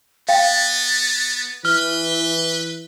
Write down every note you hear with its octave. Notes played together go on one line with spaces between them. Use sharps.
B3 F5 G5 A6
E3 B4 F6 G7